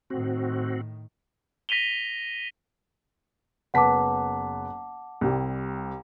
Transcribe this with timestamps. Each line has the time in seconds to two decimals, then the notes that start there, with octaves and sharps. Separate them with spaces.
0.10 A2 D#3 C4 F#4
1.69 A#6 B6 D#7 F7 G7
3.74 F#1 B3 F#5 A5 D6 B6
5.21 C2 G3